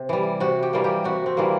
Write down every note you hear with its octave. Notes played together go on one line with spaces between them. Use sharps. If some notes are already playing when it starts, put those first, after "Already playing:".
Already playing: C3
E3 G3
C3 F#4
G4
E3 G3 A#3
G4
C3 F#4
C4
E3 G3 A#3